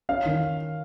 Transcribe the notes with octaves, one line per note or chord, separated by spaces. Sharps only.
C#4 F5
D#3